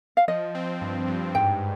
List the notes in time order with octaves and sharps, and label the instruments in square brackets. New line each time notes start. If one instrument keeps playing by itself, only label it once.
[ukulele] F5
[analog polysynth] F3 [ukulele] D#5
[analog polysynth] C4
G2
G2
[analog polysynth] G#2 [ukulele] G5